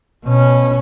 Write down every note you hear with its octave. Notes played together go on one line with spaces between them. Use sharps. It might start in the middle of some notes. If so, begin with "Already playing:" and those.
B2 C#4